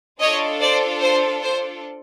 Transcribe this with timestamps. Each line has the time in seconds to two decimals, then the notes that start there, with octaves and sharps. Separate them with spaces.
0.20 D4 F4 A4 C#5 D#5
0.61 C5 D5
1.01 C5
1.42 C5